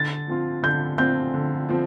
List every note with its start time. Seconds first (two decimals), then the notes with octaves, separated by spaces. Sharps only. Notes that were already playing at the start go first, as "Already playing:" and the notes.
Already playing: D3 A6
0.27 F3 C4 F4
0.63 D3 G6
0.98 F3 C4 F4 G6
1.34 D3
1.69 F3 C4